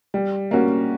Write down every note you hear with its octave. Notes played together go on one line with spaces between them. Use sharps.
G3
A#3 C#4 F#4